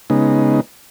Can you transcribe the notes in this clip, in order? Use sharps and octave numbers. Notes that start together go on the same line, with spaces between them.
C#3 G#3 B3 D#4